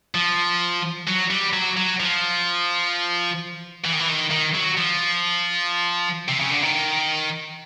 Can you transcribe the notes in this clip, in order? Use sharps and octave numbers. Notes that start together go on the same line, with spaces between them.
F3
F#3
G3
F#3
F#3
F3
E3
D#3
E3
D#3
D#3
F#3
F3
C3
C#3
D3
D#3